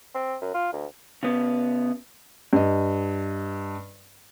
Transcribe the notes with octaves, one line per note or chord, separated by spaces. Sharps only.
C4
F#2
F4
D2
C#3 B3
G2 D#5